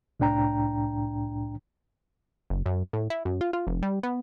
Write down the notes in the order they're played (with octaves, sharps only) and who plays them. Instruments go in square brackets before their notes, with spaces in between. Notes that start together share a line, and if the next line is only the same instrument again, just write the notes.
[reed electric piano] C2 A2 D4 G5 A#5
[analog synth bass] F#1
F#2
A2
E4
F#2
F4
F4
F1
G3
B3